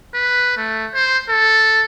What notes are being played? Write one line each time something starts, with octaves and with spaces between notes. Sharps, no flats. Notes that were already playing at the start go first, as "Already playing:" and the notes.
B4
A3
C5
A4